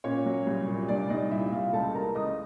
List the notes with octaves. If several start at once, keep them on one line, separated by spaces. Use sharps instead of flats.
A#2 C#4 C#5
F#3
C2
A#2
C2 D4 D5
C2 D#4 D#5
A#2 E4 E5
C2 F4 F5
C#2 A4 A5
E3 A#4 A#5
C#2 D#5 D#6